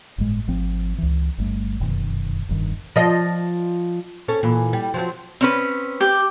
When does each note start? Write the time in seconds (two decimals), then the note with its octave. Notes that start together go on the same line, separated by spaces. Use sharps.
0.18 G1 A2 G#3
0.48 G#1 F3 C4
0.98 C#2 E3
1.38 G1 G3 A3
1.80 F1 F#2 B2 D#3
2.49 F1 G2 D#3
2.96 F3 D#5
4.28 C#4 A4 C#5
4.43 A#2 E3
4.73 G3
4.94 F3 F#3 C4
5.41 C4 C#4 B4
6.01 G4